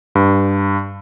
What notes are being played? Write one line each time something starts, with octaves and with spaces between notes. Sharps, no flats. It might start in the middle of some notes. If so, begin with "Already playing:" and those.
G2